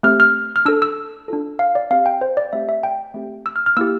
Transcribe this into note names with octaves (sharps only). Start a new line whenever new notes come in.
A3 C4 G4 F6
F6
F6
D4 A4 E6
E6
D4 F4 A4
F5
D5
C4 G4 F5
G5
C5
D5
A3 C4 G4 E5
E5
G5
A3 C4 G4
E6
F6
F6
A#3 E4 G4 E6